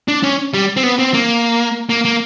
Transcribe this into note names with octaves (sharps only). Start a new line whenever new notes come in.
D4
C#4
G3
C4
B3
C4
A#3
A#3
A#3